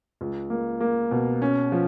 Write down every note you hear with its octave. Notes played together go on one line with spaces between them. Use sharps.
C#2
A#3
A#3
B2
C#4
F3